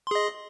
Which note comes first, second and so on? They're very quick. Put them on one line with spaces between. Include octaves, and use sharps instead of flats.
C6 G#4 D#5